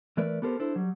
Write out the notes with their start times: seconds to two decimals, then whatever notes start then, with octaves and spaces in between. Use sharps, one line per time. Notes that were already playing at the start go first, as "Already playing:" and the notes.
0.17 E3 A3 A#4 B4 D5
0.42 B3 G4 A4 A#4 C5
0.59 D4 E4 A4 C5
0.76 F#3 G3